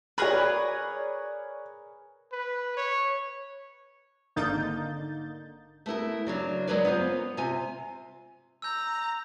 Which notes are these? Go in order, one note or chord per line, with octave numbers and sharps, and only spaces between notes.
G#4 A#4 B4 C#5 D5 B5
B4
C#5
G#1 D3 A#3 D#4 G6 A6
A3 B3 E4 A#4
C#3 F#3 D4
F#3 G#3 A#3 A#4 B4 D5
B3 C#4 F4 C5
C3 F4 G#5
A#5 E6 G6